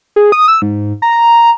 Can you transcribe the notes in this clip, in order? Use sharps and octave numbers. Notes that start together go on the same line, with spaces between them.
G#4
D#6
E6
G#2
A#5